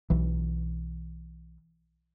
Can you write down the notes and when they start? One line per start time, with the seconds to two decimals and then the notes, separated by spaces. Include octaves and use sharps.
0.10 B1 E3